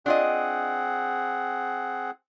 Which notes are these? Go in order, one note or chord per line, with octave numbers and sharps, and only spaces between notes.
C4 D4 F4 G#4 D#5 F#5